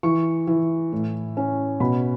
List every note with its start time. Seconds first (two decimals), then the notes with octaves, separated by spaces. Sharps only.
0.03 E3 C#6
0.47 E3
0.93 A2
1.37 C#4
1.80 B2 B5